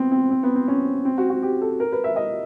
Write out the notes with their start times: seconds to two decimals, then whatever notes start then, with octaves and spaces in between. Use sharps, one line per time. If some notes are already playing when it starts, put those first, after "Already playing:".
Already playing: B3 C4
0.12 C4
0.31 C4
0.43 B3
0.55 C4
0.68 C#4
1.05 C4
1.18 F#4
1.30 F#4
1.43 G4
1.61 A4
1.80 A#4
1.92 B4
2.04 E5
2.16 D#5